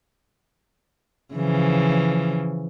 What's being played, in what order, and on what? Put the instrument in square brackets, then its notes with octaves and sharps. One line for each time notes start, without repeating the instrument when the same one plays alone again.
[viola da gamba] C#3 E3 F3